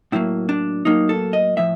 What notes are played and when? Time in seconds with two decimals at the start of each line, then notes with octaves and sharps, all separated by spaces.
0.12 A2 F#3 A#3 E4
0.49 D4
0.85 A2 F#3 A#3 D#4
1.09 A4
1.33 D#5
1.57 A2 F3 E5